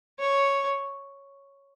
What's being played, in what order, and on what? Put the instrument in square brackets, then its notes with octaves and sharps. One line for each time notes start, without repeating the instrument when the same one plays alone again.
[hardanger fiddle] C#5